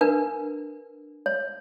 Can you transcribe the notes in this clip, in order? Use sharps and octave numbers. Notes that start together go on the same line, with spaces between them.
D4 A#4 B4
C#5